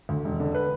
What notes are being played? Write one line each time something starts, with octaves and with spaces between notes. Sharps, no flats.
D2
E1
D3
B4